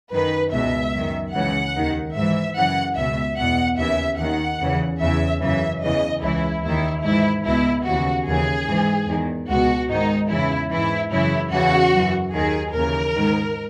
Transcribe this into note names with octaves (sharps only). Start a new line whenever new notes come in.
F#2 D#3 B4
C#2 B2 E5
F#2 D#3
C#2 C#3 E3 F#5
D#2 D#3
G#2 E3 E5
F#2 C#3 E3 F#5
C#2 B2 E5
E2 B2 F#5
D#2 C#3 E3 E5
D#2 D#3 F#5
E2 C#3 E3
E2 C#3 E3 E5
F#2 C#3 E3 E5
E2 C#3 E3 D#5
C#2 C#3 E3 E4
D#2 D#3 E4
G#2 E3 E4
C#2 B2 E4
D#2 C#3 E3 F#4
D#2 C#3 E3 G#4
G#2 E3
E2 D#3
C#2 B2 F#4
G#2 D#3 D#4
E2 C#3 E3 E4
G#2 E3 E4
F#2 C#3 E3 E4
E2 C#3 E3 F#4
F#2 E3
D#2 D#3 G#4
D#2 C#3 E3 A#4
G#2 D#3